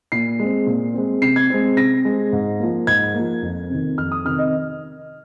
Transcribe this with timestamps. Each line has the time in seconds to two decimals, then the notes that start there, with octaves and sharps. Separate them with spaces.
0.12 A#2 C7
0.39 G#3 C4
0.67 A#2
0.94 G#3 C4
1.22 C3 C7
1.36 G#6
1.50 G#3 C4
1.77 C3 A#6
2.05 G#3 C4
2.33 G#2
2.60 F3 A#3
2.87 G#2 G#6
3.14 F3 A#3
3.43 F2
3.70 C3 D#3
3.98 F2 F6
4.12 D#6
4.25 C3 D#3 F6
4.38 D#5